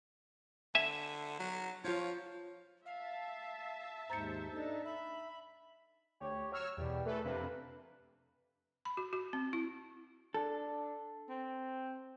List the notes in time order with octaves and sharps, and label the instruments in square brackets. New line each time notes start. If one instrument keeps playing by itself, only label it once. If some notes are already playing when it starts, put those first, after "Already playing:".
[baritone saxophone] D3 [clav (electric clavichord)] E5 G#5
[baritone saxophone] F#3
[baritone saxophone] F3 [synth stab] F4 C#5
[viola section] E5 A5 [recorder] F5
[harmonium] D#2 G#2 [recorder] C5 [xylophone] A#5 A6 C#7
[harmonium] D4 D#4 [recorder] A4
[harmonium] E5 [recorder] B5
[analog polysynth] D2 [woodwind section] G4 C#5
[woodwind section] F#3 [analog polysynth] C#5 E6 F6
[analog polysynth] E2 B2 [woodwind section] G3
[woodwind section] E2 E3 [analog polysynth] A3 A4 B4
[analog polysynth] F2 C3 D4 [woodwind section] E3 A#3 B4
[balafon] B5
F#4
F#4
C4
E4
[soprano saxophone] D4 [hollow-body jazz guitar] A4
[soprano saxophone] C4